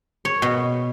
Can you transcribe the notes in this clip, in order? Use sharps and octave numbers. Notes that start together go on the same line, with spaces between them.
C#5
B2